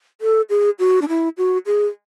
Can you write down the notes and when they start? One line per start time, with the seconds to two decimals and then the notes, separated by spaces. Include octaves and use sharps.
0.21 A4
0.50 G#4
0.79 F#4
1.02 D4
1.08 E4
1.38 F#4
1.66 G#4